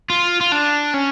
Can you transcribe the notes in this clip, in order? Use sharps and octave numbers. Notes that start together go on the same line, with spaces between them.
F4
F4
D4
C#4